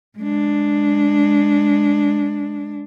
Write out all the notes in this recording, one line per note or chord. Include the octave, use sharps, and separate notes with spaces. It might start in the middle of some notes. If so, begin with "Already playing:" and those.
G#3 D4